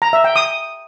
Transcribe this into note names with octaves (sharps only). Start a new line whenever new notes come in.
A#5
E5
G5
D#6